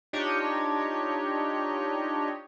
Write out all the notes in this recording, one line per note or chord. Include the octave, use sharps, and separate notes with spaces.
D4 D#4 F4 G4 C#5 D#5